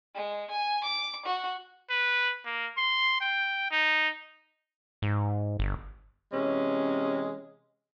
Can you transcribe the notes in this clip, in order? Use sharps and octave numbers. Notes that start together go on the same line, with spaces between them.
G#3
G#5
D6
F#4
B4
A#3
C6
G5
D#4
G#2
G1
C3 E3 G#3 C#4